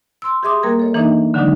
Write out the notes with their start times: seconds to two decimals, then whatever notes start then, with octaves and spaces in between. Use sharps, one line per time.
0.22 C6 E6
0.43 G4 G#4 E5 C6 D6 D#6
0.63 G3 A#3 A#4 F#6 G#6
0.79 A4 C#5 D#5
0.94 E3 A#3 D4 D#4 D#5
1.34 D3 D#3 F#3 G#3 D4 D#4